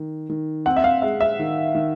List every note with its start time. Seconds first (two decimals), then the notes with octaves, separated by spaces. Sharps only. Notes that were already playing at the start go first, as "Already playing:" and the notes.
Already playing: D#3
0.29 D#3
0.66 C4 F#5
0.77 E5
0.84 F5
1.02 G#3 E5
1.21 E5
1.39 D#3
1.75 D#3